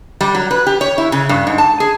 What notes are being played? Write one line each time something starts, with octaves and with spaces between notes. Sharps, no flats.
G3
F#3
B4
G4
C#5
E4
C#3
G2
G#2
A5
G#4